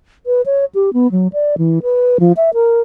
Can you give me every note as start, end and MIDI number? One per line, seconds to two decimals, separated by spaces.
0.26 0.42 71
0.46 0.65 73
0.75 0.93 67
0.93 1.10 59
1.12 1.28 54
1.33 1.55 74
1.58 1.79 52
1.83 2.18 71
2.20 2.33 53
2.37 2.50 76
2.54 2.81 70